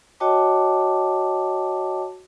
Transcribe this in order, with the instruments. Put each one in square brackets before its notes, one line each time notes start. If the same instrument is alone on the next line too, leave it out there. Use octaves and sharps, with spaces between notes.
[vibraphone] F#4 C#5 D#5 G5 A5 D6